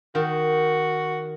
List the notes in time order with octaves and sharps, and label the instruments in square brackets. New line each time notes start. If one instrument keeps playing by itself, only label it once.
[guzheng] D#3 [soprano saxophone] F#4